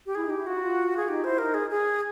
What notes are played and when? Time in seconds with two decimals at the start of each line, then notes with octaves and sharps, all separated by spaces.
0.06 G4
0.15 E4 G#4
0.25 D#4 G4
0.36 E4
0.46 F4 F#4
0.54 E4
0.61 F4
0.97 G#4
1.08 D#4 G4
1.24 E4 C5
1.38 D#4 A#4
1.54 G#4
1.70 G#4